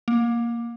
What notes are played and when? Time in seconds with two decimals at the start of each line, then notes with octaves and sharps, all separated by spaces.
0.08 A#3